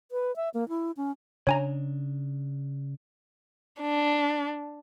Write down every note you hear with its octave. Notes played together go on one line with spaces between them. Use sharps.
B4
E5
A#3
E4
C#4
C#3 D4 C#5 G#5 A#5
D4